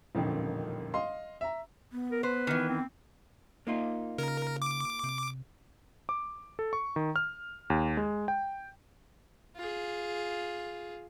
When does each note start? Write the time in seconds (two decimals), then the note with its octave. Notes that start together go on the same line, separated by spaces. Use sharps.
0.15 D#1 A1 F2 A#2 D3 D#3
0.94 D#5 F5 C6
1.41 E5 A#5
1.92 B3
2.11 A#4
2.23 B4 C5
2.47 D#3 E3
2.69 C4
3.67 A#3 D#4 F4
4.18 C#3 A#4
4.62 D6
5.04 C3
6.09 D6
6.59 A4
6.73 C#6
6.96 D#3
7.16 F6
7.70 D#2
7.97 G#3
8.28 G5
9.56 F4 G#4